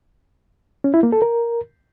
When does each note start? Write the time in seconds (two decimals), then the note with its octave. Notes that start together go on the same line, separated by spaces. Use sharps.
0.84 C#4
0.94 E4
1.03 A#3
1.12 A4
1.22 A#4